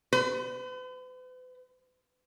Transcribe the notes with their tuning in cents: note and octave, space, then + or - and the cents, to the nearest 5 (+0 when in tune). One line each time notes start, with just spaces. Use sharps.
B4 +45